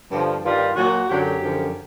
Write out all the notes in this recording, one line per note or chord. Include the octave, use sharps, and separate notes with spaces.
G2 D3 F3
G2 D#3 G3 F4
A#2 F#3 F#4
F#2 D3 F#3 G4
F#2 D3 F3